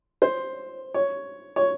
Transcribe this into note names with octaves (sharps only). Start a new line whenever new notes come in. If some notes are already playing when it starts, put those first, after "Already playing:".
C5
C#5
C#5